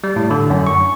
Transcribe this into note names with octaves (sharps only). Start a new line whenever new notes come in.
G3
A2
D3
F#2
C#6